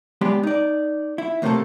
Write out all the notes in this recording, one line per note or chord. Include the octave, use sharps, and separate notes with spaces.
G#3 B3 D4 G4
D#4 D5
E4
D2 A2 C3 A3 A#3 A4